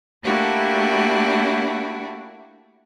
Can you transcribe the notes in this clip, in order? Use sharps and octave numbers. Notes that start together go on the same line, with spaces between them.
A3 A#3 D4 E4 F#4 G4